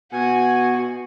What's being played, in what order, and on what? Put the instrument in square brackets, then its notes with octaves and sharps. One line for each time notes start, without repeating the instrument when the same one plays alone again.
[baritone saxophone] B2 [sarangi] F#4 [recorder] G#5